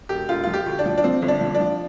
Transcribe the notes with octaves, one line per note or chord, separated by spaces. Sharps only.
E1 G4
E1 F4
F3 F4
G4
D2
D4
F3
D4
F3 C4
G1
D4
F3
D4
F3